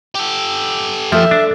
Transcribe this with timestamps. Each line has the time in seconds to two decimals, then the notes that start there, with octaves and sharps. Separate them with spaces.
0.15 G4 A4
1.12 F3 A3 E5
1.31 D4